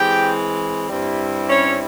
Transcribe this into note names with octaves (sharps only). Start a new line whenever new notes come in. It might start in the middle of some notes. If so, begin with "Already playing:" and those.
Already playing: E3 G#3 C4 G4 G5
G2 G3 C4 E4
C#4 C#5